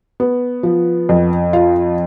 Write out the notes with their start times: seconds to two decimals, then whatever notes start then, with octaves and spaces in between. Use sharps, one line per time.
0.20 B3
0.63 F3
1.09 F2
1.53 F4